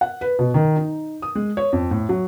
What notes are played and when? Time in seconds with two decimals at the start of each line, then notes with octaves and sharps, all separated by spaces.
0.01 F#5
0.21 B4
0.39 B2
0.54 D#3
0.76 D#4
1.22 D#6
1.35 G#3
1.57 C#5
1.73 F2
1.91 A2
2.09 F#3